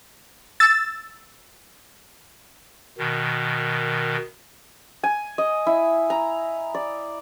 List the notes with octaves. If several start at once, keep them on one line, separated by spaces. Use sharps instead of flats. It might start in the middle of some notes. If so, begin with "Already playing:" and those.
E6 A6
B2 D#3
G#5
D#5
E4
A#5
D5